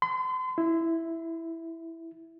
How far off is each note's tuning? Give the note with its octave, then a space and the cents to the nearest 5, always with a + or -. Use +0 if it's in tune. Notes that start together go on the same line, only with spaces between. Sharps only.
C6 -40
E4 +0